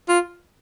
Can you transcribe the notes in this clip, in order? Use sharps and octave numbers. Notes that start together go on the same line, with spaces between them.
F4